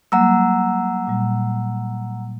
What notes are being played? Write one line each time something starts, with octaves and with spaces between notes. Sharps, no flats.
F#3 G3 A#3 F#5 A#5 E6
A#2 G3